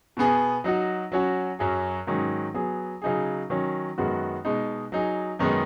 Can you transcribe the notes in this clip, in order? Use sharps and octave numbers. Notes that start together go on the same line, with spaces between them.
B2 B3 G#4
F#3 D#4 F#4
F#3 C#4 F#4
F#2 F#3 C#4 G#4
G#2 D#3 F#3 C#4
F#3 B3 G#4
C#3 F#3 D#4 G#4
D#3 F#3 C#4
F#2 D#3 G#3 B3 F#4
B2 G#3 D#4
F#3 D#4 G#4
F#2 D#3 G#3 B3 D#4